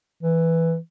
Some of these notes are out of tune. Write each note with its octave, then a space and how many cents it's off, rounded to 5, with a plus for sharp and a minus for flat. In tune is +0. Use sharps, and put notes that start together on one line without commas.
E3 +0